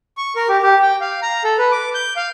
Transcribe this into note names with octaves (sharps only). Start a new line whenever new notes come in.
C#6
A#4
G4
G4
G5
F5
A#5
A4
B4
D6
G6
F5